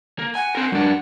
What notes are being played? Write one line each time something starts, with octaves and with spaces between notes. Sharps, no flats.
A#3
F#5 G#5
C4 A#4
F#2 D4